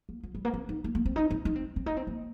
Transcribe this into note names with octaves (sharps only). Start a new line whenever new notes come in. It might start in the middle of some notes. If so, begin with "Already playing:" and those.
A#3
F3
G3
A#3
C4
D#4
A#3
A#3
C4
D#4
C4
D#4
C4
C4
D#4
C4
A#3